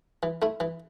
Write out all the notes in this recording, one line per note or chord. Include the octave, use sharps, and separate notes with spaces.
E3
A3 E4
E3